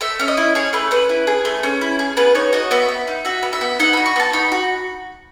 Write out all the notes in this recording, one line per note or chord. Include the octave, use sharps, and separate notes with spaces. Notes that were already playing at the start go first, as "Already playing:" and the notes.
A3 E5
C#4 E5
D#5
E4
G#4 C#5
A3 B4
C#4 B4
E4
G#4
A3
C#4
E4
G#4
B3 B4
D#4 C#5
F#4 D#5
B3 E5
B3
D#4
F#4 E5
B3
E5
B3
D#4 F#5
F#4 B5
C#6
B3 A5
D#4 B5
F#4